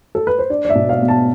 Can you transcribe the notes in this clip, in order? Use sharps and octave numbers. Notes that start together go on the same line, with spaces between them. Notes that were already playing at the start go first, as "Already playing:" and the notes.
A4
B4
C5
D4 D5
D5
E5
B2
F5
B3
A5